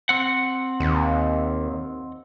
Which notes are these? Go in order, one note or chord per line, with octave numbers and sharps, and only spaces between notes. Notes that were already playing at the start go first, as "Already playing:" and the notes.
C4 F#5
D#2